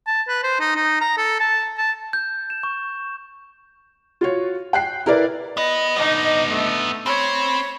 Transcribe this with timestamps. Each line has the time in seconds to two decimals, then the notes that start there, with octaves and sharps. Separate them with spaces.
0.07 A5
0.28 B4
0.43 C5
0.60 D#4
0.76 D#4
1.01 A#5
1.17 A4
1.40 A5
1.78 A5
2.13 G6
2.50 E7
2.63 C#6
4.21 F4 F#4 C#5
4.73 G5 F#6 C7
5.06 E4 A#4 B4 D5
5.57 B3 B4 D#5
5.96 B3 D4 D#4
6.49 A3
7.06 C4 C#5 B5